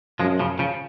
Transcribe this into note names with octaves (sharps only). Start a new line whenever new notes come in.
F#2 F3 G#3
C#3 F3
C#3 F3